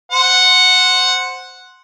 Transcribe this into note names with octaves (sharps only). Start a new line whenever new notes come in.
C5 F#5